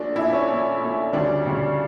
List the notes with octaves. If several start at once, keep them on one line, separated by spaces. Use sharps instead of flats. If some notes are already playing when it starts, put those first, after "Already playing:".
Already playing: A#1 A#2 A3 D4
A#1 A#2 A3 E4
C#4
A#1 A#2 A3
A#1 A#2 A3
D2 C#3 G3 D4
D2 C#3 G3